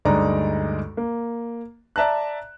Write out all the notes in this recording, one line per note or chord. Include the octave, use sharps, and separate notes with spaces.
D2 G2 G#3 D#4 D5 A#5
A#3
D5 E5 A5 A#5 F#6